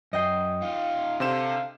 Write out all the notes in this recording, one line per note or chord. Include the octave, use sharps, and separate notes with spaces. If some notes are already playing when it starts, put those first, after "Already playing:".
F#2 D#5 G5 C7
D#4 F4 F5
C3 D4 A4 C5 F5 E7